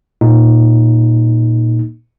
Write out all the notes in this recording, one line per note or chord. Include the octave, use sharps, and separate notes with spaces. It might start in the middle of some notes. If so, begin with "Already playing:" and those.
A#2 A#3 D#4